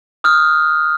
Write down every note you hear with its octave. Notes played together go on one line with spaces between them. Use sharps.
D#6 F6 F#6